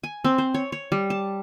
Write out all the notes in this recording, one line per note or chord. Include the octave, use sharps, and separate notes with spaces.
G#5
C4
C5
C#5
C#5
G3
A5